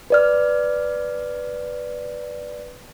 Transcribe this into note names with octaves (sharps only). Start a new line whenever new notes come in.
B4 D5 F6